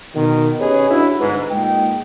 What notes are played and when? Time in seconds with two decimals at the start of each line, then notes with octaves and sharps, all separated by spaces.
0.15 B2 D#3
0.60 C#4 G4 G#4 B4 C#5 D#5
0.90 D4 E4 F#4
1.20 G1 G#2 B4
1.50 A#2 G#3 D#4 G5